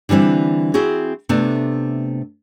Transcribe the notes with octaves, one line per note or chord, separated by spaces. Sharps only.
D3 E3 G3 C4 E4
C4 E4 F#4 G#4
C3 A3 B3 D4